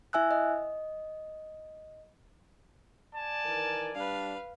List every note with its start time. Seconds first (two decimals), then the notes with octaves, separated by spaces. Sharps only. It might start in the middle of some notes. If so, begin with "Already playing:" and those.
0.13 E4 E5 G#5 E6 F#6
0.31 D#5
3.15 D5 G#5 A5
3.45 D#3 E3 A#4
3.95 G3 D4 B4 F5